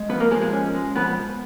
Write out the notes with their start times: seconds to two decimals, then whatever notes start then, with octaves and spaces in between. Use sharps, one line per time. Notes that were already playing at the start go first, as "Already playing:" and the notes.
Already playing: G#3
0.09 F3 B3 B4
0.20 A#3 A#4
0.31 F3 G#3 G#4
0.41 G#3 G#4
0.53 C#4
0.74 G#3
0.96 F3 B3 B4